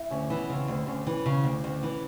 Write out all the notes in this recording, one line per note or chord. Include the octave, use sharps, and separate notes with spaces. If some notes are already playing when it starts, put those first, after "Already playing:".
Already playing: E4
D2 C#4
E3 B3
C#3 C4
D2
D2 C#4
E3
C#3 C#4
D2
D2
E3